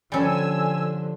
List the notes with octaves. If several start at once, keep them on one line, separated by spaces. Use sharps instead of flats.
D3 F3 G3 C#4 G#5 E6